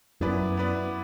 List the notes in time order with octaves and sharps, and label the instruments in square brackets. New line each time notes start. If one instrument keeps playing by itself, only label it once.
[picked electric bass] F#2 [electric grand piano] B3 E4 B4 D5
[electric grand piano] B3 E4 B4 D5